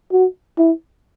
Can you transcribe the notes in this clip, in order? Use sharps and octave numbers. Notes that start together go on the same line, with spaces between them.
F#4
E4